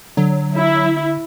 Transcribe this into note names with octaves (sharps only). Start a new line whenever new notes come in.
D3 F#3
E4